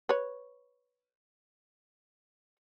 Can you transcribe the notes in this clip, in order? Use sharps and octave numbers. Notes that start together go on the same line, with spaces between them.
B4 C#5